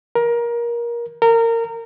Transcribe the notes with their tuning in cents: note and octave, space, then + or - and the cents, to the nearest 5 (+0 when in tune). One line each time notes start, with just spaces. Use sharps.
A#4 +20
A#4 -25